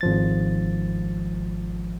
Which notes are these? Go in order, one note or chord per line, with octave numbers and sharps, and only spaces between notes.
G#1 F3 A6